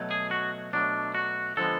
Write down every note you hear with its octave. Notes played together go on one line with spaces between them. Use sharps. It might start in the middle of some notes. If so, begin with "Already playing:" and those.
Already playing: B2 F#3 A3
G#4
F#4
B2 F#3 A3 D4
F#4
D3 F3 G#3 B3 A4